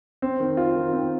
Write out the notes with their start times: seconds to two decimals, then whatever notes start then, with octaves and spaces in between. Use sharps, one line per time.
0.22 C4
0.40 D#3
0.57 F4
0.75 D#3
0.93 C4